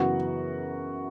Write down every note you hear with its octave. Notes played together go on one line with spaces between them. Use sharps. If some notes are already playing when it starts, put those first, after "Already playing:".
Already playing: F#2 C#3 E3 B3 F#4 F#5